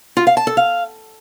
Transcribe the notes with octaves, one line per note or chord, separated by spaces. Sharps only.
F4
F5
A5
A4
F5